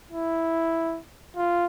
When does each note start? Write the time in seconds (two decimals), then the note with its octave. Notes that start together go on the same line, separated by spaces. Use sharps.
0.11 E4
1.37 F4